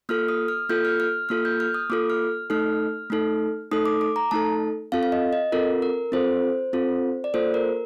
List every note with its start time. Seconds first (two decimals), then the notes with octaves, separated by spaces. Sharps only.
0.09 A#3 F4 A4 F6
0.28 D#6
0.48 F6
0.69 A#3 F4 A4 G6
0.85 F6
1.00 F6
1.29 A#3 F4 A4 F6
1.45 G6
1.60 F6
1.74 D#6
1.90 A#3 F4 A4 D6
2.10 F6
2.50 A3 D#4 A4 F6
3.10 A3 D#4 A4
3.71 A3 D#4 A4 D#6
3.86 D6
4.01 D6
4.16 A#5
4.31 A3 D#4 A4 A5
4.92 C4 F4 A4 F5
5.03 F5
5.12 D#5
5.33 D#5
5.52 C4 F4 A4 A#4
5.82 A#4
6.12 C4 F4 A4 C5
6.73 C4 F4 A4
7.24 D5
7.34 A#3 F4 A4 C5
7.54 A#4